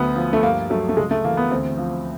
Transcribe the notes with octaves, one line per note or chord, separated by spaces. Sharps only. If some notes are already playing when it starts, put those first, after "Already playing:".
Already playing: D2 F#3 B3
F3
A3
G2 A#3
F#3 A3
A3
C#2 G#3
A3
E3 A#3
B3
D2 C4
F3